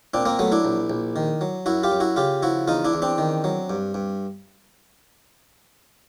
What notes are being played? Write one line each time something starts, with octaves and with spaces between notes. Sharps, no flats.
A#2 C4 D4
A#3 C4
F#3 A3 B3
D4 E4
A#1
A#1
D#3
F#3
F#2 E4 F#4
F4 G4
F#2
E4 F#4
C#3 F4 G4
F3 E4 F#4
E2 D#4 F4
D4 E4
E2
C4 D4
D#3
F#3
G2
G2